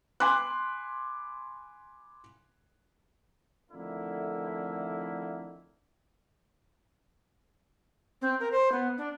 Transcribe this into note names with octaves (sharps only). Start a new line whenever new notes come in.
G#5 B5 C6 D6 F#6
F2 D3 D#3 A3 A#3 E4
C4
A#4
C5
B3
D4